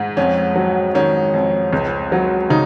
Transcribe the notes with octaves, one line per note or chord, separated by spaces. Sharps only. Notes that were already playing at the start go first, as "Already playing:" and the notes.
Already playing: G#2
F2 C#4
F#3
D#3 C#4
F2
C#2
F#3
C#3 D#4